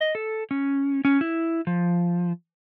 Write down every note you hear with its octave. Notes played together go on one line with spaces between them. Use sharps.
D#5
A4
C#4
C#4
E4
F3